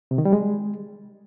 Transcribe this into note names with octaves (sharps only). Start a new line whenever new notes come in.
C3
D#3
G3
G#3